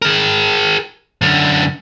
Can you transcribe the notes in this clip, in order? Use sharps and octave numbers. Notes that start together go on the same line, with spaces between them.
G#4 A#4
F#2 D3